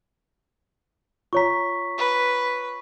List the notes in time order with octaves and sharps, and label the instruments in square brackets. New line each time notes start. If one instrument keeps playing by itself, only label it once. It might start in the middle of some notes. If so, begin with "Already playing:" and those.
[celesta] F4 C#5 A#5 [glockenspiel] C#6 B6
[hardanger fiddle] B4